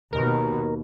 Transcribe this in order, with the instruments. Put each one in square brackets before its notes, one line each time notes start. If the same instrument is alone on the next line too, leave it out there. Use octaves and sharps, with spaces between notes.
[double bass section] D#2 B2 [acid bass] A#4